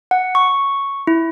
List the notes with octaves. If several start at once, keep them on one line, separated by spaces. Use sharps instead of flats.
F#5
C#6
E4